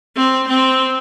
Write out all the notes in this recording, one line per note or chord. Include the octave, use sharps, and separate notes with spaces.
C4
C4